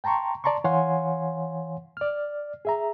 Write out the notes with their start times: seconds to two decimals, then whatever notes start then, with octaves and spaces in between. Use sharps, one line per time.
0.04 G5 A5 A#5 C6 C#6
0.44 D5 A5 A#5 C6 C#6
0.64 E3 C#5 F5 F#5 G#5 C6
1.97 D5 F6
2.65 G#4 E5 A#5